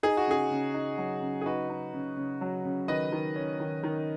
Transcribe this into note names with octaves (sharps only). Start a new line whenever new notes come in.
D#4 G#4
F#4
C#3 G#4
C#3
D#4
F#3
C#3
G#4
D#4 F#4 B4
D#4
C#3
C#3
F#3
C#3
D#3 B4 D#5
D#3
C#4
D#3
D#3